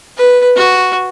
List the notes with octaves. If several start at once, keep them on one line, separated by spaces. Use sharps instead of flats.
B4
F#4